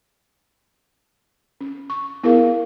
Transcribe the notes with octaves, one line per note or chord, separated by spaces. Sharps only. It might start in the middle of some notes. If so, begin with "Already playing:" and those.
C#4
C#6
B3 E4 G#4 A#4 F5